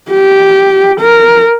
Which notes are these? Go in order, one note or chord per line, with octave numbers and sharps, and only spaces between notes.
G4
A#4